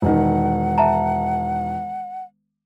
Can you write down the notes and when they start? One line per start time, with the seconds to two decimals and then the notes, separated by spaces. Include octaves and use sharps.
0.02 E1 D#3 F#5
0.78 E5 A5 A#5